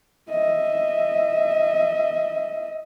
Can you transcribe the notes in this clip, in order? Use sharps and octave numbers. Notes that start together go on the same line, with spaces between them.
D#5 E5